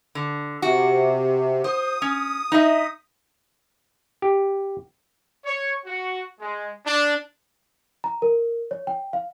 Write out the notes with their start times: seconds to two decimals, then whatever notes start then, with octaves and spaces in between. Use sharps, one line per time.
0.15 D3
0.62 C3 F#4
1.64 C5 D#6
2.02 C#4
2.52 D#4 D#5 E5
4.22 G4
5.45 C#5
5.86 F#4
6.40 G#3
6.85 D4
8.04 A#5
8.22 A#4
8.71 C#5
8.87 G5
9.13 F5